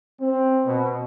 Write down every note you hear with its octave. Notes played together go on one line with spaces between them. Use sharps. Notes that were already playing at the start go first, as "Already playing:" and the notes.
C4
B2